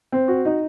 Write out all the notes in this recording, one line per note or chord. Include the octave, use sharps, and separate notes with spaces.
C4
F#4
D#4